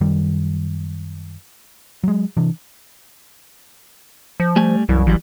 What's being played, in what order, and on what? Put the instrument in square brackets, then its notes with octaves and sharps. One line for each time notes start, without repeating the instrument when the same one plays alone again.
[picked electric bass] F#2 D#3 G3
F#3 G#3
C3 E3 D4
[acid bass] F3
[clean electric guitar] G3 A3 G#5
[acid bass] C2 [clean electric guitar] F#2 E3
[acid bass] A1 [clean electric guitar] E3 F#3 G3